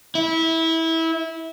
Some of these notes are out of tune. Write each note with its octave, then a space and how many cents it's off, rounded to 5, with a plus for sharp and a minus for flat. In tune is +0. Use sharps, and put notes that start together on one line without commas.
E4 -20